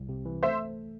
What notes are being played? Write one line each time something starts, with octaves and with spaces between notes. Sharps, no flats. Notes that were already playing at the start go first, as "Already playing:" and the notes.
Already playing: C2
C3
E3
A3 C5 E5